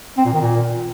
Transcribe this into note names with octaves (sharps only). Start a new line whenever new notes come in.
C4
A#2
D#3
A#2